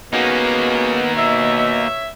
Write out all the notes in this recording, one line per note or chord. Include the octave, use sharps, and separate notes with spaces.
G#3 A#3 B3 C#4 D#4 F#4
B2 C#5 E5